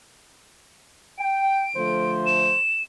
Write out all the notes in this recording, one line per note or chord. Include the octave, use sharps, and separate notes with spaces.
G5 D7
D3 F3 A3 C5
E7